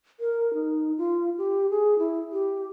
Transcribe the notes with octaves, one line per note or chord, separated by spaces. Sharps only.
A#4
D#4
F4
G4
G#4
E4
G4